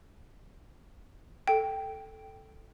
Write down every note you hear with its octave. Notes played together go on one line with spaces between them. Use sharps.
A4 G5